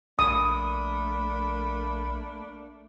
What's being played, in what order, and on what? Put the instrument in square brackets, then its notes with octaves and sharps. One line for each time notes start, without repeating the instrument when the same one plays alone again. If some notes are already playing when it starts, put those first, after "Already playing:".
[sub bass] A#1 [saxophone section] A3 A#3 D4 [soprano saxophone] B5 [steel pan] D#6